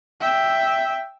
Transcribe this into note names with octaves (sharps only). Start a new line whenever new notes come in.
E5 G5